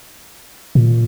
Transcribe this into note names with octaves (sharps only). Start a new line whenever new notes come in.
A#2